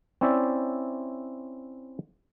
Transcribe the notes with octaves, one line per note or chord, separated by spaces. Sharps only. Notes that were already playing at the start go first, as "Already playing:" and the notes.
C4 C#4 E4 C5 D5 E5